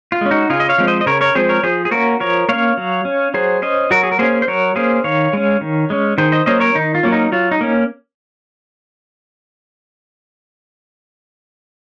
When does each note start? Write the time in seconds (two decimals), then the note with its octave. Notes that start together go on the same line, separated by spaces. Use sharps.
0.12 F4
0.21 G#3 C#4
0.31 D#4 F#4
0.50 C#3 F4 G#4
0.60 D#5
0.69 C#5 F5
0.78 F3 G#3 C4
0.87 C5 D#5
1.01 D#5
1.06 C#3 A#4 C#5
1.21 A#4 C#5
1.35 F3 G#3 C4 G#4 C5
1.49 A#4 C#5
1.63 F3 G#4 C5
1.85 G#4
1.91 A#3 C#4 F#4 A#4
2.20 F3 A#4 C#5
2.49 A#3 C#4 C#5 F5
2.77 F#3
3.05 C#4
3.34 F#3 G#4 C5
3.62 C#4 C5 D#5
3.91 F#3 F#4 A#4
4.03 G#4
4.12 A#4
4.19 A#3 C#4 G#4 C5
4.42 C5
4.48 F#3 A#4 C#5
4.75 A#3 C#4 G#4 C5
5.04 D#3 C#5 F5
5.33 G#3 C#4
5.61 D#3
5.90 G#3 C#4
6.18 D#3 G#4 C5
6.32 C5 D#5
6.46 F#3 A#3 C#4 C5 D#5
6.60 A#4 C#5
6.75 D#3 D#4
6.95 F4
7.03 F#3 A#3 C#4
7.12 D#4
7.32 F#3 F4
7.51 D#4
7.61 A#3 C#4